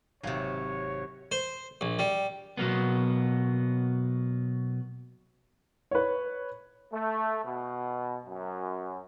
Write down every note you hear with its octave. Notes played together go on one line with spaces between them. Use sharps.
G#1 C3 F#3 C#5 F5
C5
A#1
G3
B2 F#3 A#3 B3
B4 C#5
A3
B2
F#2